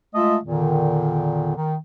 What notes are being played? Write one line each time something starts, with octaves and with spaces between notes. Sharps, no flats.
G#3 A3 F4 D#5 E5
E2 A#2 D3 D#3
D#3